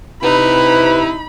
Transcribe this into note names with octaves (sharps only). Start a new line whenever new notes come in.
C3 D#4 E4 B4 B5